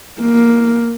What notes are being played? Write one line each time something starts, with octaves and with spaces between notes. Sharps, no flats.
A#3